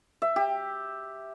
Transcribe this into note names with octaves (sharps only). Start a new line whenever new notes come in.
E5
G4